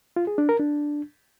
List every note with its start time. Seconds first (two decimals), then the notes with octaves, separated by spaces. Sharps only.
0.16 F4
0.27 G#4
0.38 D4
0.49 A#4
0.60 D4